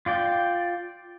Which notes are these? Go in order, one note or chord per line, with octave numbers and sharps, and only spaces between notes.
F4 D5 G5